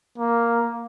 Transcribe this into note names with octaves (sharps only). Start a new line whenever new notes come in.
A#3